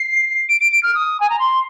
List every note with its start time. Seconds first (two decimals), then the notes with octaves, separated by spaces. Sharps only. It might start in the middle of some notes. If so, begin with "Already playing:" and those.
Already playing: C7
0.49 D7
0.60 D7
0.71 D7
0.83 F6
0.94 D#6
1.20 G#5
1.29 A#5
1.39 C6